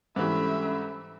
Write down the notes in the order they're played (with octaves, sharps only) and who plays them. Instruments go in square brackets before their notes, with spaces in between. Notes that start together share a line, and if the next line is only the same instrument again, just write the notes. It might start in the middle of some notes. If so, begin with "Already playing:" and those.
[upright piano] G#2 E3 G3 [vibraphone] C#4 D4 A4 [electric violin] E5 B5